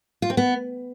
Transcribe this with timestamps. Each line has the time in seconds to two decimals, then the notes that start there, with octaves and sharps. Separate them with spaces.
0.22 F4
0.30 C4
0.37 B3